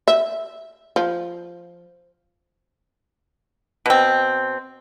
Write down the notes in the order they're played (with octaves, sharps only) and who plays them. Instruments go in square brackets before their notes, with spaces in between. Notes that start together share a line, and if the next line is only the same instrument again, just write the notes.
[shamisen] E5
F3
[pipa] B2 C4